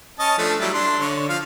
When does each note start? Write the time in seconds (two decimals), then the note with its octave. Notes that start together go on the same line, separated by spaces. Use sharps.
0.19 C#4 D#5 A5
0.38 F3 A3 D4
0.60 F#3 G3 E4
0.74 D4 C6
1.00 D3 C#5
1.29 F3 F5